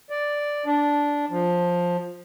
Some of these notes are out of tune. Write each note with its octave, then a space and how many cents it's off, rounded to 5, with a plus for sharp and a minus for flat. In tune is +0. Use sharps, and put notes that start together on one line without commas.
D5 +0
D4 -10
F3 +10